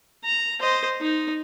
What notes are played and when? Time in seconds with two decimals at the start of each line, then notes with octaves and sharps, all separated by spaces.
0.24 A#5
0.60 C5 D#5
1.01 D#4